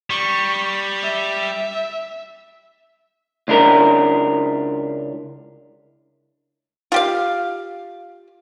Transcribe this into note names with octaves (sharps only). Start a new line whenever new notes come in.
G3 C#6
E5
C#2 D4 E4 A#4
F4 G4 F5